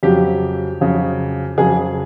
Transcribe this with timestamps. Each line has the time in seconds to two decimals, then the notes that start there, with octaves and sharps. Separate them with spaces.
0.03 F2 C#3 F#3 G4
0.80 F2 C#3 F#3
1.58 F2 C#3 F#3 G#4